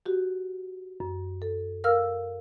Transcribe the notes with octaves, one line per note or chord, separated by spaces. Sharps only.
F#4 G4
F#2
A4
A#4 F5 E6 F6